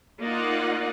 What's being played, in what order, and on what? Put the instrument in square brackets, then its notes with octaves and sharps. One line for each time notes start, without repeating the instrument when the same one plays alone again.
[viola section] A#3 D#4 F4 D5 D#5 F#5